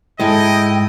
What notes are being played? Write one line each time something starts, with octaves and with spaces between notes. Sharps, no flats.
G#2 G#3 E4 A4 D#5 G5 G#5